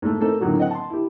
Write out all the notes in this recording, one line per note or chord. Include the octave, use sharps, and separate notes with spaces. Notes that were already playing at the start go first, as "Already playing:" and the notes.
G#2 A3
A3 A#3 C4 D#4 A4
A2 D3 D#3 F#3 A#3 F#4
C4 D#5 F#5
A5 C6
E4 G4